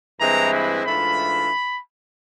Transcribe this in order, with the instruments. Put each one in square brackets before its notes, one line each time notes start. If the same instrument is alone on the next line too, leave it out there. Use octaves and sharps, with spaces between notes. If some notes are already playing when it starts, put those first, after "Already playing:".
[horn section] G2 E3 G#3 C4 E4 A#5
B5
G#2 E3 A3 D4 F4 B5